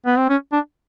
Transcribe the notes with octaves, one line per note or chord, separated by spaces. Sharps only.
B3
C4
C#4
D4